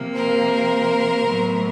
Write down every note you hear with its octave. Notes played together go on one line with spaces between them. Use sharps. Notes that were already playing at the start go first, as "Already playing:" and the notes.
Already playing: C3 F3 A#3
A#4 C5
A2 F#3 B3